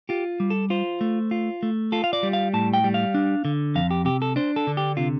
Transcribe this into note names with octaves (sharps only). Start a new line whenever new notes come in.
F4 G4
G3
A4
F4 C5
A3
F4
A3
F4 A4
F5
D5
G3
F5
A2 A5
G5
G3
F5
D4
D3
F2 F5
G4
C3 G4
A4
D4 C5
A4
D3
G4
C3 F4